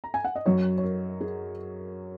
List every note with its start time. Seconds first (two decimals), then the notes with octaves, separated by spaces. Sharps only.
0.04 A#5
0.14 G#5
0.24 F#5
0.35 D#5
0.46 F#2 F#3 C#5
0.78 C#5
0.83 A#4
1.21 G#4